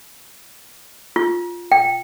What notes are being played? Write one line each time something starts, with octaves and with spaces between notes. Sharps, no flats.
F4
G5